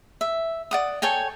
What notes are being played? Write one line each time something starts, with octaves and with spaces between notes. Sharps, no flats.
E5
D5 F#5 D#6
A4 C#5 G5 G#5